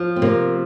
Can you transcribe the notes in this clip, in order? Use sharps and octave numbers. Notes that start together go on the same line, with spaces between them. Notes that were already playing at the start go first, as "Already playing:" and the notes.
Already playing: F3
C4
C3 A#3